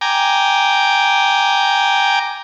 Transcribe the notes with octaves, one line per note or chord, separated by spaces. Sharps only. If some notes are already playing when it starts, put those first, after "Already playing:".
G5 G#5 A#5 D6